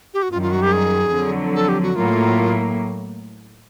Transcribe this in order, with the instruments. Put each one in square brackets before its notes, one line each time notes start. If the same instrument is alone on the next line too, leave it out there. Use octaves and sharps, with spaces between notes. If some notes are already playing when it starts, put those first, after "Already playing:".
[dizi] G4
F#4
[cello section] F#2 D#3 G3 [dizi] F4
[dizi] F4
F#4
G4
G#4
[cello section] F2 D3 F#3
[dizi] A4
G4
F#4
[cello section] A2 F#3 A#3 [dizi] F4